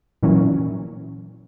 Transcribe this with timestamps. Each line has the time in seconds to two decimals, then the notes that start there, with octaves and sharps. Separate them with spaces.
0.23 A#2 E3 F#3 C#4